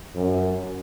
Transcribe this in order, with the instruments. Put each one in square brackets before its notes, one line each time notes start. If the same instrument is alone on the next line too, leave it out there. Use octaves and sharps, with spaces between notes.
[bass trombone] F#2